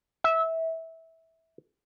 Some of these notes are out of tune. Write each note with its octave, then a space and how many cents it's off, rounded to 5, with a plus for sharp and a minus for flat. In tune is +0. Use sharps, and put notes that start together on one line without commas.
E5 -20